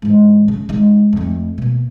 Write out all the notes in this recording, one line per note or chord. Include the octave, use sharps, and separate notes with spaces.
G#2 E3
C#3
G#3 D#4
F2 A3
B2 A#3